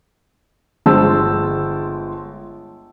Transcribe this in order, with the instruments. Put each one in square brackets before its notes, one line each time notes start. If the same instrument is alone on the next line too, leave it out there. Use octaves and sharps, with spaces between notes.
[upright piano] G1 G#3 C5 A5 E6